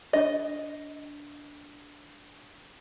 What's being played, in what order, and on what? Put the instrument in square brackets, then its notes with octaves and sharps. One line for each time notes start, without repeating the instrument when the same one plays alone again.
[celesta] D4 [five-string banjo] D#5